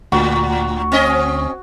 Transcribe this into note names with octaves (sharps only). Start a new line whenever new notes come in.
D2 A2 F#4
C4 C#4 D#5